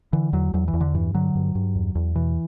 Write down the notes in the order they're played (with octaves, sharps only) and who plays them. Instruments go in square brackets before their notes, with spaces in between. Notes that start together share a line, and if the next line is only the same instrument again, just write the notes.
[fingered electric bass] D3 E3
E2 F#3
E2 F#3
E3
E2
D3
G2 E3
D3 F#3
G2
G2
E2
E2
B2 E3